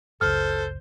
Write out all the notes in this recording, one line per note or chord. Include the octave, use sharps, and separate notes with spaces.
F#1 C#2 A4 C5 F6